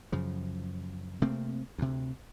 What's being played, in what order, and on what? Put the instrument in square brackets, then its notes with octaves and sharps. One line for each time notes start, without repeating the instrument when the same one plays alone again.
[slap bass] F#2 C#3 F3
C3 A3 A#3 C4
D2 C3